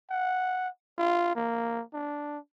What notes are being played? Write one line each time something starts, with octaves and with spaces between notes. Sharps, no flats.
F#5
F4
A#3
D4